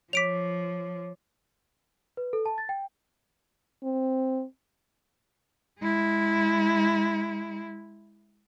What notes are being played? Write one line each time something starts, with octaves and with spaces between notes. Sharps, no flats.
F3 C#5 D6 B6 D7 F7
B4
A4
A5
A6
G5
C4
G#3 E4